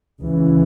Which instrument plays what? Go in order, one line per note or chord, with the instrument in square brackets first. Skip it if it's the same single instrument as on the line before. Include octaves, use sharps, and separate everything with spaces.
[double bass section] C#2 C#3 E3